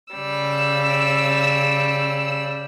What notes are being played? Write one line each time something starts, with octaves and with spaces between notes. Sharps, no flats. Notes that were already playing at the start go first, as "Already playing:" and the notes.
C#3 G3 E6